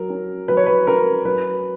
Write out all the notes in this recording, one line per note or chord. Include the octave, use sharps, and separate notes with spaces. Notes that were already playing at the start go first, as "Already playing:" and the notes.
Already playing: F#3 A#4
C#4
F#3 B4
C#5
B4
C#4 A#4
F#3 B4